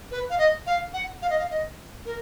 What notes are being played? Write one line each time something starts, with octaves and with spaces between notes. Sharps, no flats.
B4
F5
D#5
F5
F#5
F5
D#5
F5
D#5
A#4